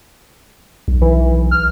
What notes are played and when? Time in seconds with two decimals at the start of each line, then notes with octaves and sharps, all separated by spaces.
0.88 B1
1.01 E3
1.51 F6